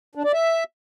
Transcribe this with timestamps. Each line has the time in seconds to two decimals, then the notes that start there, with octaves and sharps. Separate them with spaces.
0.15 D4
0.24 D5
0.33 E5